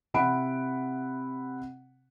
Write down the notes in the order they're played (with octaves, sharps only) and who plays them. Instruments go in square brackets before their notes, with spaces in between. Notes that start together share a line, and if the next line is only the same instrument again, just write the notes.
[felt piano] C3 C4 E4 F#5 B5 D7